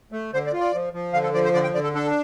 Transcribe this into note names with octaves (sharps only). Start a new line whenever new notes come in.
A3
D3 C5
D5
F4
D5
F3
F3
D3 F5
A4
F3 D5
C5
D3 D5
G5
D3 D5
A4
D4 A4